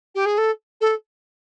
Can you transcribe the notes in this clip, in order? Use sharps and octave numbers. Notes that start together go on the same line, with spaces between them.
G4
G#4
A4
A4